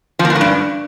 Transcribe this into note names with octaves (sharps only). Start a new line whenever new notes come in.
F3
A#3
E3
A2
G2